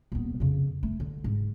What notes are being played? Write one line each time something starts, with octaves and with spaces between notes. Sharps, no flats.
D#1 B3
F2 C#3
A3
D3
G#2